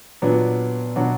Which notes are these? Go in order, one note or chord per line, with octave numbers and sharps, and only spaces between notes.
A#2 F#3 B3 D4
B2 F#3 D4 F#4